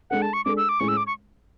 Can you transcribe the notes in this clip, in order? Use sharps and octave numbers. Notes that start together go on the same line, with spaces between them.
G#3 D4 A4 F#5
A5
C#6
G#3 D4 A4 D6
E6
D6
A2 G#3 C#4 C#6
E6
D6
C#6